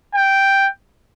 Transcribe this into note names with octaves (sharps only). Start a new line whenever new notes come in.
G5